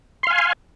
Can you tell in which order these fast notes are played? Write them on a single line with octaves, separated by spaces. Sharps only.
C6 F5 G#5